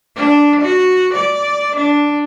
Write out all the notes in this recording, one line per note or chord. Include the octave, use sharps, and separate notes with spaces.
D4
F#4
D5
D4